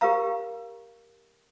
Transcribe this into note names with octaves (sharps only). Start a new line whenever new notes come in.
G4 A#4 F5 A#5